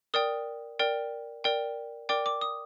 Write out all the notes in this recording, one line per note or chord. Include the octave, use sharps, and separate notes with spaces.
A#4 D5 G5 D#6
A#4 D5 G5
A#4 D5 G5
A#4 D5 G5 D6
D6
D#6